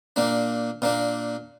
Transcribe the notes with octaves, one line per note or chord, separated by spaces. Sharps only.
A#2 A#3 D4
A#2 A#3 D4